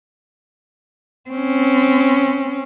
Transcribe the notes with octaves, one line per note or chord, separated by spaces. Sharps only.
C4 C#4